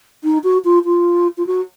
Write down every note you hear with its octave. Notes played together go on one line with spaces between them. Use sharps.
D#4
F#4
F4
F4
F4
F#4